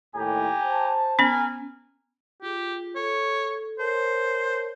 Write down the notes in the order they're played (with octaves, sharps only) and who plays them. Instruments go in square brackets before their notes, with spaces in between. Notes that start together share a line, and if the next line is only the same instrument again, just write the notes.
[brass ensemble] D#2 A2 [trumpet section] G4 G#5 A#5
[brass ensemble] C5 A5
[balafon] B3 C#4 [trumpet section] A#4 G#5
[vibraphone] F4 G#4 [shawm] G4
[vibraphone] A4 [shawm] C#5
[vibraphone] A#4 C#5 A5 [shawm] C5